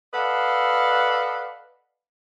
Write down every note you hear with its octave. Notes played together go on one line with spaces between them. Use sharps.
A4 B4 D5 D#5 F5 F#5